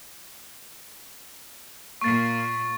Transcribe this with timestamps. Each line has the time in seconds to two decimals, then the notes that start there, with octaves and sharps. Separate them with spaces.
2.01 A#2 A#3 C#6 A6